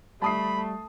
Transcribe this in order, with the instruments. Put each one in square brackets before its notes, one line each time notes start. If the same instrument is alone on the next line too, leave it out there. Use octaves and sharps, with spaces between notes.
[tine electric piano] G3 [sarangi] A3 [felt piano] A5 D#6 C7 [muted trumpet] B5